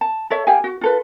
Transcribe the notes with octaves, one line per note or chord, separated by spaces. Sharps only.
A5
A4 C#5 E5
G4 F5 G5 G#5
F#4
F4 A4 B4